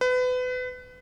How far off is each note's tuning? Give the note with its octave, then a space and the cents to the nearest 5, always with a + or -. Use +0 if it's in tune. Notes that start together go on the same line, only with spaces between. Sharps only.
B4 +30